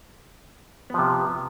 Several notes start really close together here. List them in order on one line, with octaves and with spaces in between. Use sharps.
B3 F3 C3